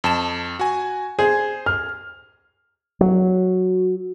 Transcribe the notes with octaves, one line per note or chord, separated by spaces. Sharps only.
F2 A5 E7
F#4 G#5
G#4 C5
F6
F#3